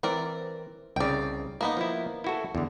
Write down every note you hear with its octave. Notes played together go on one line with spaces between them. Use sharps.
E3 C4 A#4 D5
C2 C#3 D5 G5
A#3 B3 D#4
F3 E4
E4 F#4 A4
E2 D3